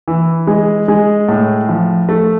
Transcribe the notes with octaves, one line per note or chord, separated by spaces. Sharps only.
E3
G#3
G#3
A2
F3
A3